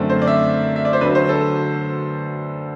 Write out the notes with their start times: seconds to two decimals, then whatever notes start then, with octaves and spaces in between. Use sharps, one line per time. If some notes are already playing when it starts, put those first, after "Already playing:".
Already playing: F#2 D3 A3 C4
0.09 C5
0.22 D5
0.27 E5
0.76 E5
0.85 D5
0.93 C5
1.01 D2 D3 F#3 B4
1.15 C5
1.29 A4